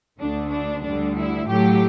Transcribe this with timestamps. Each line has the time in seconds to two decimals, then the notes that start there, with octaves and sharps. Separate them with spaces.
0.19 D2 D3 A3 D4
0.51 D4
0.83 D2 D3 G3 D4
1.16 E4
1.48 A2 F#3 A3 G4